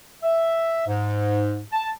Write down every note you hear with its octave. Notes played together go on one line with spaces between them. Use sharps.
E5
G#2
A5